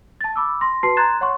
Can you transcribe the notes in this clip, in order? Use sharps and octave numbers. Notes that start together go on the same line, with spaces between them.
A5 A6
B5 D6 E6
C6 A#6
F#4 B4 A5 C6 C7
A#5 C6 F#6 G#6 A6 E7
C#5 F#5 C6 C#6